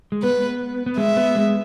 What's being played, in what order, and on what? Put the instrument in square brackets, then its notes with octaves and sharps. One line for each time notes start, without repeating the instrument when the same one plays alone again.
[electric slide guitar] G#3
[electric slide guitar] B3 [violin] B4
[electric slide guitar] B3
[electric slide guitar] G#3 [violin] E5
[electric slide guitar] B3
G#3